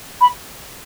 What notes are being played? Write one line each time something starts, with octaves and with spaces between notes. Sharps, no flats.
B5